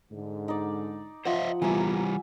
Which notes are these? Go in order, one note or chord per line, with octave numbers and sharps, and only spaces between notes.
G#2 D3
D#4 D5
F3 C5 D#5 E5 F#5
A#1 E3 G3 B3 E5 G#5 A#5